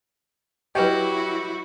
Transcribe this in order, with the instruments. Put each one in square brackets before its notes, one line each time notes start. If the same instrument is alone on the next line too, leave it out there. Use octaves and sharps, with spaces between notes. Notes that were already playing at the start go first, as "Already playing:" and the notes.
[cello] F#3 E4 [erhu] F#4 [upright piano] G4 [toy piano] B4 D#5